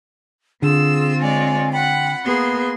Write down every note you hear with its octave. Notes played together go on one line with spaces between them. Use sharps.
D3 C4 F4 G#4 E6
G#3 C#5 D5 G#5
F#5 G5 B5
A#3 B3 G#4 C6